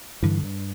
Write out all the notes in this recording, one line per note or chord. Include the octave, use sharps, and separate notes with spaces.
G2 D3 E3
G2